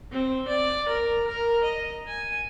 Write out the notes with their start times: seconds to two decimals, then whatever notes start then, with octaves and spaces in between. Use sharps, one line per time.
0.11 C4
0.48 D5
0.88 A#4
1.27 A#4
1.64 D#5
2.08 G#5